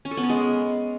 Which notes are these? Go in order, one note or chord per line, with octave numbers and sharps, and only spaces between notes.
C#4
A4
B3
C#4
G#3